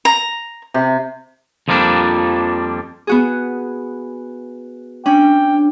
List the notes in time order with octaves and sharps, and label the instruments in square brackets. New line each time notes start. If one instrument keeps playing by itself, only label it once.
[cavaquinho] A#5
[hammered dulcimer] C3
[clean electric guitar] F2 F3 G3 A#3 D4
[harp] B3 F#4 G#4
[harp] C#4 [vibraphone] D4 [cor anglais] G5